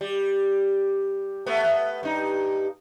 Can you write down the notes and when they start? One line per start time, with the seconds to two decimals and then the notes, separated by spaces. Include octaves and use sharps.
0.01 G3
1.46 A3 B3
2.03 G2 D#4